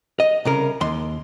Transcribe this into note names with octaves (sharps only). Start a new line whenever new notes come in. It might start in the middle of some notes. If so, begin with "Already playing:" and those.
D#5
C2 C#3 A#4
D#2 C6